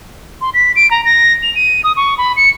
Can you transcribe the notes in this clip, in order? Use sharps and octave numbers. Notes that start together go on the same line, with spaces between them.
C6
B6
D7
A#5
A#6
F7
D#7
D#6
C#6
B5
C#7